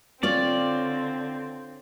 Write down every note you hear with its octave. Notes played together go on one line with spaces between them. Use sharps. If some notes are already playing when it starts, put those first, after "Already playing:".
D3 C4 F4 C#5 D5